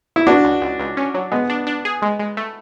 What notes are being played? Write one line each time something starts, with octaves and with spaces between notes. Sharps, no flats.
E4
B2 D4 F#4
C#2
C#2
C#2
C#4
F#3
G#3 B3
D4
D4
G#4
G#3
G#3
A3